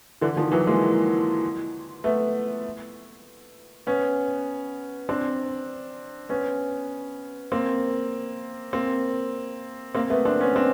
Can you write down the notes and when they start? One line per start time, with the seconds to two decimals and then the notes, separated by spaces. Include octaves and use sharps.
0.21 D3 E3
0.36 D#3 F3
0.52 E3 F#3
0.67 G#3 A#3
2.04 A3 B3
3.87 B3 C#4
5.09 C4 D4
6.29 B3 C#4
7.52 A#3 C4
8.73 A#3 C4
9.95 A#3 C4
10.10 A3 B3
10.25 C4 D4
10.40 B3 C#4
10.56 C4 D4